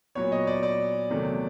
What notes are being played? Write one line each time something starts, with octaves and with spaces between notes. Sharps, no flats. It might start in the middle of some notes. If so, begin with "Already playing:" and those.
A#2 F#3 B3 C#5
D#5
D5
D5
E2 C3 D#3 F#3 A3